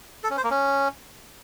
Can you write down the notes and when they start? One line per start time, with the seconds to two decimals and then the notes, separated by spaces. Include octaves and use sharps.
0.24 A4
0.30 C#4
0.37 C5
0.44 A#3
0.51 C#4